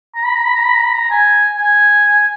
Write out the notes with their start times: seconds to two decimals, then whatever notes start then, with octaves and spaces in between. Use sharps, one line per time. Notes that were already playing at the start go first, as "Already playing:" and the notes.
0.15 A#5
0.25 B5
0.36 A#5
0.44 B5
0.55 A#5
0.65 B5
0.74 A#5
0.85 B5
0.94 A#5
1.10 G#5
1.58 G#5